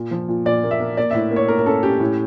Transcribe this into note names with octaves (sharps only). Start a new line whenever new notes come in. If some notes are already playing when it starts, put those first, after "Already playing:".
Already playing: A#2
F3
A#2
A#2 D5
A#3
E5
A#3
A#3 D5
A2 E5
A#3
C#5
A#3 A#4
A#4
C#4 A4
C#4 G4
A2